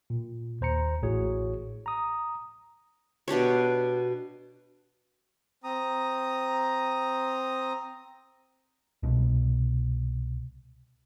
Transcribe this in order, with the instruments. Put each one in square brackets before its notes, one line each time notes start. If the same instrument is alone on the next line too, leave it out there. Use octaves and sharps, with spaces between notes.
[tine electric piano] A#2
D#2 C5 A#5 C#7
A1 A2 F#4 G#4 C#5
A#5 D#6
[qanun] B2 D4 G4 C#5
[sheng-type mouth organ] C4 A#5 D#6
[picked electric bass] C2 B2